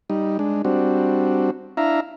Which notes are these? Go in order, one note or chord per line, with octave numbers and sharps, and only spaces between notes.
G3 D#4
G#3 D4
G3 C4 D4 F#4
D4 E4 E5 F5 A#5